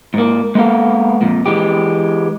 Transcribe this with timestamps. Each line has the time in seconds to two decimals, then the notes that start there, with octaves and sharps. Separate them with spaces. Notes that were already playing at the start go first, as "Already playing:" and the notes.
0.14 G#2 A#3
0.55 G#3 A#3 B3 A4 F5
1.21 F2 A#2
1.46 E3 G#3 G4